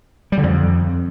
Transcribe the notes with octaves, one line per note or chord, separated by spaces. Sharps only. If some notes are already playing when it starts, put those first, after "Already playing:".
G3
D3
F2